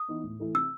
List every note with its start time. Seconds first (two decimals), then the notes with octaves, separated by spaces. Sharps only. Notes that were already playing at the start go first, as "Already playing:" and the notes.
Already playing: D#6
0.08 E3 B3 D#4
0.24 A2
0.40 E3 A3 E4
0.54 C3 E6